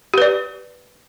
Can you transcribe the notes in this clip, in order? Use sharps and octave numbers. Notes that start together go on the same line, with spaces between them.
G4 B4 D5